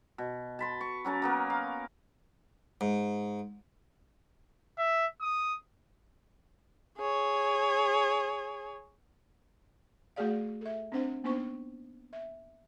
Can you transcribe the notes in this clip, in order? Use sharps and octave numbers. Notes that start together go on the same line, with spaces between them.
B2
A5 B5 C6
C#6
F#3 C#4 A#4 A5
A#3 B3 A#4
F5
G#2
E5
D#6
G#4 C#5
A3 F#4 G#4 D5 F5
A4 E5
C4 D4 C5 F#5
A#3 B3 D4 D#4 C5 C#6
E5